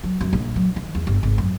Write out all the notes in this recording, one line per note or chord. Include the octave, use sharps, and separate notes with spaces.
F#3
F#2
A#1
F#3
D#3
E2
G1
G#1
F#2